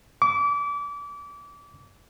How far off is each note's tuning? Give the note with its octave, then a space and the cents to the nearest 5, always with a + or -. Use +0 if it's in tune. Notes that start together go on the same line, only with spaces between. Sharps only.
D6 -30